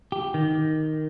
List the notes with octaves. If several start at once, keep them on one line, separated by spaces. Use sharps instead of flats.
G4
D#3